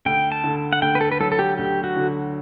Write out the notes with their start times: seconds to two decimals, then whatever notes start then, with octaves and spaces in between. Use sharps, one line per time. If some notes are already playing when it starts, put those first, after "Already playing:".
0.05 D2 G5
0.32 A5
0.44 D3
0.73 F#5
0.82 D2 G5
0.95 B4
1.01 A4
1.12 B4
1.20 F#3 A4
1.32 A4
1.39 G4
1.58 D2 G4
1.84 F#4
1.96 D3